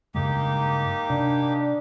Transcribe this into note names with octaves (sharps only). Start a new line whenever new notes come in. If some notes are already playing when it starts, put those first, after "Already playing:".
G2 C#3 G#3 A#3 D#4 G4
C3 D4